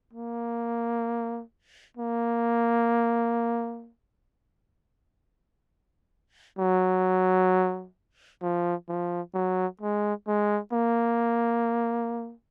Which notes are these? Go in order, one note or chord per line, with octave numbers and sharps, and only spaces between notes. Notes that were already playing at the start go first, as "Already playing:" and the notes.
A#3
A#3
F#3
F3
F3
F#3
G#3
G#3
A#3